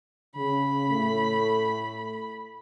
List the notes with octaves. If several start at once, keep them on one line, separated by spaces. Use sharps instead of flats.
C#3 B5
A2 A3